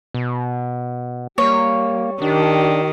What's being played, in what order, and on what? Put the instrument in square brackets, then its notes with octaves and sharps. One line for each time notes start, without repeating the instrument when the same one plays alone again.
[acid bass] B2
[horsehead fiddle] G3 [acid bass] A#3 [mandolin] C#5
[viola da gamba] D#3 [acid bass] D4 [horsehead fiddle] G4